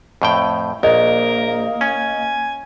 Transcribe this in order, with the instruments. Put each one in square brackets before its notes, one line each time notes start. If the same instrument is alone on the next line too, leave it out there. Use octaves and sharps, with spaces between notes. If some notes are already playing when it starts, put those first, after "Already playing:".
[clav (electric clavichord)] F2 A2 G5
[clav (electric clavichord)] A#1 [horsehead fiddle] A#3 [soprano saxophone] A#4 [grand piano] D#5
[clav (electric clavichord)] C#4 [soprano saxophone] G#5